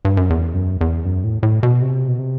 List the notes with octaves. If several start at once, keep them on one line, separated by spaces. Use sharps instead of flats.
G2
F#2
E2
F#2
E2
F#2
A2
A2
B2
C3
B2
C3